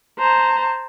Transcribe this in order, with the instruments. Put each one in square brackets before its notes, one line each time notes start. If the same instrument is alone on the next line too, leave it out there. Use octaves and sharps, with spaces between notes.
[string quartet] C5 A5 A#5